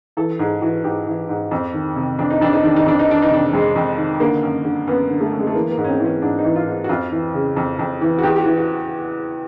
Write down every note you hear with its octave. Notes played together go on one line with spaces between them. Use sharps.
E3 A4
G#2 G#4
E3 F#4
G#2 G4
E3
G#2
F2
D#3
C3
F2 D4
D#4
F2 D4
D#4
D#3 D4
D#4
F2 D4
D#4
D#3 D4
D#4
C3 D4
F2 G#3
F2
D#3
D3 A#3
F#2
D3
F#2 B3
D3
A3
F#2
G#3
A3
E3 A#3
A#3
G#2
C#4
C4
E3
C#4
G#2 D4
D#4
E3
F4
G#2
F#4
F2 F4
E3
C#3
F2
F2
E3
F#4
E2 G4
G4
F#4
E3
F#4